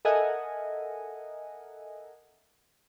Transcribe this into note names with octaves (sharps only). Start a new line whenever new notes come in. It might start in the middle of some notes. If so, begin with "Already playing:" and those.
A4 A#4 D#5 E5 F#5 G#5